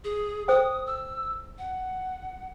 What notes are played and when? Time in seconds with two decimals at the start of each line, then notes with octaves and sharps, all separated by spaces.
0.05 G#4
0.48 A4 C5 G5 D#6
0.87 E6
1.58 F#5